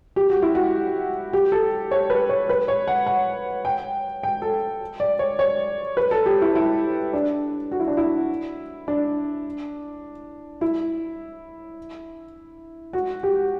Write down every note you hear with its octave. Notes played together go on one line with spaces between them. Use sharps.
G4
F#4
E4
F#4
G4
A4
C#5
B4
C#5
B4
C#5
F#5
F#5
G5
G5
A4
D5
C#5
C#5
B4
A4
G4
E4
E4
D4
F#4
E4
D4
E4
D4
E4
F#4
G4